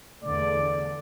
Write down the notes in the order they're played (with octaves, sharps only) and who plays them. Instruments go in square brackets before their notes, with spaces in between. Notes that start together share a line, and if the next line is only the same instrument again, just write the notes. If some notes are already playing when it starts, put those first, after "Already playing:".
[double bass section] E2 D3 A3 [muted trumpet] D5